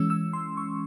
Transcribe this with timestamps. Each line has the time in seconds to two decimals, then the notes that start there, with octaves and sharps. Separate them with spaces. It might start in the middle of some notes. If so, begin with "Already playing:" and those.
Already playing: E3 G#3 C#4 E6
0.10 E6
0.33 C6
0.57 C#6